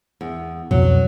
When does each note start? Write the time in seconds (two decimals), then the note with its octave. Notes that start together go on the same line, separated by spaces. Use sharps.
0.21 E2
0.71 C2 F2 B2 F#3